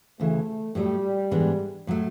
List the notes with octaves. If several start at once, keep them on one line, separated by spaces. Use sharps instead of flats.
D2 C#3 E3 A3
A2 F#3 G3 A3
G#2 E3 G#3 B3 D4
A2 F#3 A3